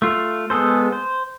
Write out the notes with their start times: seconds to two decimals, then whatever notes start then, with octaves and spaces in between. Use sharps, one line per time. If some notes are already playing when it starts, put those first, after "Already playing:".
0.02 A3 F4
0.50 G#3 B3 G#4 A4 C5
0.92 C5